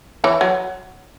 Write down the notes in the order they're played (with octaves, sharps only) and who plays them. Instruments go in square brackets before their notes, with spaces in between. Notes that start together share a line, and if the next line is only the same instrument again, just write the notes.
[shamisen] E3 [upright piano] C#5
[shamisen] F#3